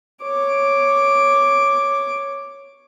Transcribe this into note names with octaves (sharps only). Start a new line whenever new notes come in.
C#5 D6